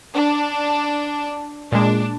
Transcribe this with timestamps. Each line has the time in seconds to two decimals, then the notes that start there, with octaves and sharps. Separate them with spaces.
0.15 D4
1.72 A#2 G#3 D4